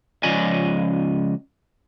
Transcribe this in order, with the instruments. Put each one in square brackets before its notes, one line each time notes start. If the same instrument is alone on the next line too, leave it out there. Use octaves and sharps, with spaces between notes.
[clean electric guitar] C#2 F3 C#4 D5 D#5 G#5